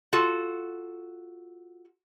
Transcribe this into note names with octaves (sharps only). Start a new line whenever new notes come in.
F4 F#4 A4